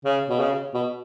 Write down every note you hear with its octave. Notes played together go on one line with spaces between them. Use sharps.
C#3
B2
C#3
B2